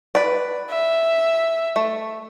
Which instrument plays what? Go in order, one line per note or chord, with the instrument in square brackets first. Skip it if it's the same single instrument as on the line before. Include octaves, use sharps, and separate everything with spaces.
[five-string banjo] B4 D5
[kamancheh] E5
[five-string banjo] A3